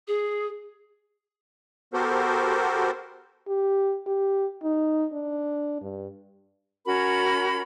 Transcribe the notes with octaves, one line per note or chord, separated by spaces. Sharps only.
G#4
B3 F#4 G4 A4 A#4 C5
G4
G4
D#4
D4
G2
C#4 F#4 A#4 B5